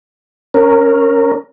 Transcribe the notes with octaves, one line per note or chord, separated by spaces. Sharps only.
C#4 A#4